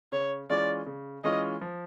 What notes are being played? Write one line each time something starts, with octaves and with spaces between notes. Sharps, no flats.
C#3 C#5
E3 G#3 C#4 F4 D5
C#3
E3 G#3 C#4 F4 D#5
F3